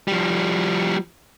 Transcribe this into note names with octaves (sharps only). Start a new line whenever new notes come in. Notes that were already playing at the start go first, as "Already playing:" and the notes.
F3 G3